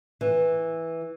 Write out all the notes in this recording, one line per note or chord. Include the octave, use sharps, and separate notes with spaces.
E3